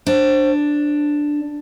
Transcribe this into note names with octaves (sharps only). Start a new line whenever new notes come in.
D4 C5